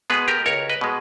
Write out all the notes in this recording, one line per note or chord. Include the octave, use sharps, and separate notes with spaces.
B2 G#3 B3 G#4 B4
G4 A#4
C#2 A#4 C#5
B4 D#5
B2 G#3